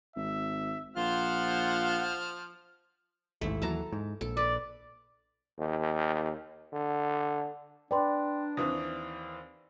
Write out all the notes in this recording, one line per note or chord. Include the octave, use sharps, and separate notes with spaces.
G#1 E5
A#1 F3 F4 C5 F#5 F6
A1 D#2 G#2 A3 E4
D#2 E3 F#3 A4 A5 A#5
G#2
A#1 A4
B4 D5
D#2
D3
D4 B4 D5 G5 A#5 C6
D#2 E3 C4 D#6